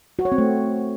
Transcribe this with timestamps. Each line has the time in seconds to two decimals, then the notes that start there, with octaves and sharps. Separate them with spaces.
0.19 F#4
0.25 C#5
0.32 C4
0.38 A3